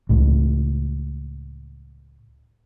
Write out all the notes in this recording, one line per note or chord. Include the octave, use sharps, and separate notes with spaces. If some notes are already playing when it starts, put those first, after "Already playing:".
C#2 A2